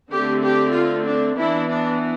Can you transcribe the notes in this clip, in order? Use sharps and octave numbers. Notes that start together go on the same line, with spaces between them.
D3 A3 C4 G4
G4
F4
D4
E3 B3 D4 E4
D4